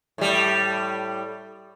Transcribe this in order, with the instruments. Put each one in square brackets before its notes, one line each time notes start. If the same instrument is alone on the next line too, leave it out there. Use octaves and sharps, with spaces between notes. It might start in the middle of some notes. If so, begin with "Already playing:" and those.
[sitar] A2 G3